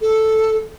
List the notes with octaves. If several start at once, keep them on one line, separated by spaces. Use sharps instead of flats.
A4